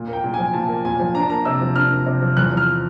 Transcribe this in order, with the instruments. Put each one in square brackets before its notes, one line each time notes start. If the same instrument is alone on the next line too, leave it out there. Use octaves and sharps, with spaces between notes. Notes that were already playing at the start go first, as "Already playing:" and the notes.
Already playing: [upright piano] A#2
A#3 G5
A#2
G#5
F3
A#2 A5
A#3
A#2 G#5
F3
D4 A#5
A5
A#3 A#5
C3 E6
F3
D4 F6
A#3
C3
F3
E2 F#6
F3
F6